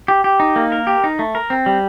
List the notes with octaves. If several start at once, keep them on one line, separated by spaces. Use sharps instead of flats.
G4
G4
D#4
A#3
A#4
G4
D#4
A3
A#4
C4
G3